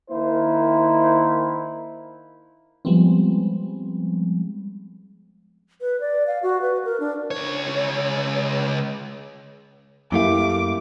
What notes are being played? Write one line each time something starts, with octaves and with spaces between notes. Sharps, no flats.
D#3 A#3 E4 A#4 C5
F3 G3 G#3 B3 C4
B4
D5
F5
F#4
B4
A#4
D4
C#2 C#5
F#2 A3 A#3 E4 G4 F5 D6